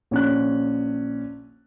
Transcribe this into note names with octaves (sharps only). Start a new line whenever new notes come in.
A#1 C#4 F#6